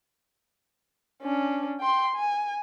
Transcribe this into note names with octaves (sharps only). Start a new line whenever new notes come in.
C#4 D4
G5 C6
G#5